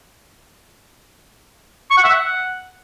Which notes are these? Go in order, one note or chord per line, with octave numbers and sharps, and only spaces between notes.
C#6
F#5
E5
F#5